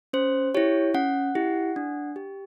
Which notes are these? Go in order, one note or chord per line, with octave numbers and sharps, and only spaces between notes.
C#4 C5
E4 G4 C#5
C#4 F#5
E4 G4
D4
G4